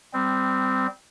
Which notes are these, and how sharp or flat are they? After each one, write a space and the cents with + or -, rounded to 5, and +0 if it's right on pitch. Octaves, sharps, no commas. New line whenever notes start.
G3 +0 C4 -15